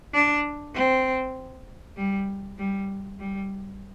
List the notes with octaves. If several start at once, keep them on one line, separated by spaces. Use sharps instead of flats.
D4
C4
G3
G3
G3